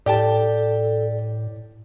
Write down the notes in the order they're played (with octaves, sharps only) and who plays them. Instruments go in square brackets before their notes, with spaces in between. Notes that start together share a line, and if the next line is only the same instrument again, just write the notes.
[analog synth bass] A2 [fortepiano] G4 G5 A5 [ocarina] A4 [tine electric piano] D5